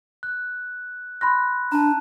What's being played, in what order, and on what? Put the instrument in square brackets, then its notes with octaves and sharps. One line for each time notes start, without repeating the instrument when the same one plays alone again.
[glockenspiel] F#6
[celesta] B5 C6 A#6 [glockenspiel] F#6
[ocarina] D4 [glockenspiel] A5 A#5